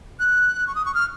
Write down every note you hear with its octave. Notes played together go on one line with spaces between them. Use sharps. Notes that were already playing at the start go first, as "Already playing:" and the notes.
F#6
C#6
D#6
C#6
F6